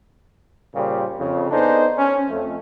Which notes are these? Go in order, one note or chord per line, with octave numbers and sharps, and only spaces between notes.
A#2 C#3 G3 A#3 G4 C5
F2 C#3
B3 D4 D#4 G#4 A4 C5
C#4
F2 A3